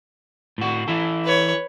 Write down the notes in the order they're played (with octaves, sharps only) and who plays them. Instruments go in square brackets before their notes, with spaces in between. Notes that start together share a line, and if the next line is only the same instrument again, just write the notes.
[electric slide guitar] A2 F#4
E3 E4 A4
[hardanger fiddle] B4 C#5